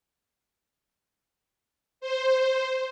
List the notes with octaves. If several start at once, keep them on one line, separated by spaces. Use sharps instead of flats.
C5